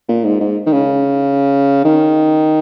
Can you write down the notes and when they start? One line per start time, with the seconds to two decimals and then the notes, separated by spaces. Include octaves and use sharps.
0.08 A#2
0.24 G#2
0.40 G#2
0.66 D#3
0.72 C#3
1.85 D#3